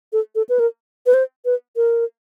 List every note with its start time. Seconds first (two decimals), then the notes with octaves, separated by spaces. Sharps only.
0.13 A4
0.35 A4
0.49 B4
0.59 A#4
1.06 B4
1.14 C5
1.45 B4
1.76 A#4